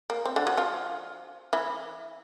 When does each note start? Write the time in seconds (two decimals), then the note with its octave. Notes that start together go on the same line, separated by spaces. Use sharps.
0.10 A#3
0.26 C4
0.36 D3 D4
0.47 F#3 F#4
0.57 F3 F4
1.53 E3 E4